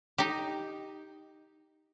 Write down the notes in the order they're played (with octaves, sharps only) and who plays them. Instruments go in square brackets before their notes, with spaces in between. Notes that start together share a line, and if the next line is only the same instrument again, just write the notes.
[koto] D#4 G4